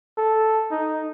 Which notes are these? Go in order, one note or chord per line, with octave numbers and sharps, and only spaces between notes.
A4
D#4